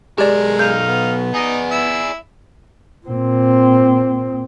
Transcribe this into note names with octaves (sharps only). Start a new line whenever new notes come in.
B1 G#3 G4 A#4 D5
D#4 F5 G6
B3
D#4 G#4 D5 D#5
E4 E6
A#2 C4